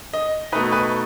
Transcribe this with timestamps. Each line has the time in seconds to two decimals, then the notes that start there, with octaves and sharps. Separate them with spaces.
0.13 D#5
0.52 B2 A3 D#4 B4
0.72 B4